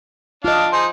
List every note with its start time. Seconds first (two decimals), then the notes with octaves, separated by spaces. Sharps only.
0.45 D4 F4 D#5 F5
0.73 D#4 G#4 C5